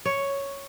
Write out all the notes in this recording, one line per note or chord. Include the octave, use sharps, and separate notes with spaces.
C#5